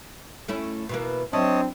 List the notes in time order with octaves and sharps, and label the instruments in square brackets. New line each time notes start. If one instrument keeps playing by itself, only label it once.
[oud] A3 C#4 E4
B2 E3 A#3
[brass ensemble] F#3 C4 D4 [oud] E4 [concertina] C#5 D#5 A5